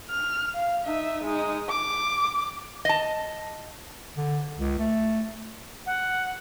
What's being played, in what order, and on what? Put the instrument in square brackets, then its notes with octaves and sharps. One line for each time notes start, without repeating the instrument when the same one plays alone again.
[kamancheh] F6
F5
D#4 E5
G#3 D#4
D6
[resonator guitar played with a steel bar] D#5 A5
[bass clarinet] D3
C#2
A3
[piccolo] F#5